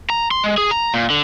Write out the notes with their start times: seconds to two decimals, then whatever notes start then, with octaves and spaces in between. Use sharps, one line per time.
0.10 A#5
0.31 C6
0.44 G#3
0.58 G#4
0.71 A#5
0.94 A#2
1.10 D3